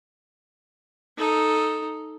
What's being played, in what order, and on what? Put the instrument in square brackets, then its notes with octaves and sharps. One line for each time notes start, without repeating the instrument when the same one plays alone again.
[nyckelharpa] D#4 A4